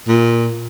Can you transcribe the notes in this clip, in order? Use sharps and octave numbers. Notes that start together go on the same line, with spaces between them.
A#2